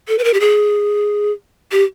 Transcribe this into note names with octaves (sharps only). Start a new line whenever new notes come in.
A4
B4
A#4
G4
G#4
G4